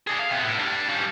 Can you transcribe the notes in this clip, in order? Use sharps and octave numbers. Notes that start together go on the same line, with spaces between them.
D4 G#4
F5
C3 B3
A2
G3 D4
C#3 G3